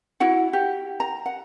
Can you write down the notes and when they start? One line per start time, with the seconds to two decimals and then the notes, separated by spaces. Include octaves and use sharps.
0.20 E4 F#4 F#5
0.53 G4
1.00 A#5
1.26 F#5